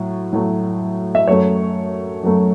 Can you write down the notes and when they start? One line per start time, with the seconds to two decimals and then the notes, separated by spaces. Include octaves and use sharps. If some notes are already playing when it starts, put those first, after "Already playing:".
Already playing: A2 F#3
0.33 A2 F#3 A3
1.15 E5
1.27 F#2 F#3 A3 C#5
2.23 F#2 F#3 A3